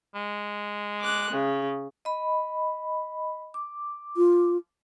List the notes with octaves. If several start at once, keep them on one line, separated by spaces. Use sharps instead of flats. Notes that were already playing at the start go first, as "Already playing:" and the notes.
G#3
D6 F#6
C#3
D#5 B5
D6
F4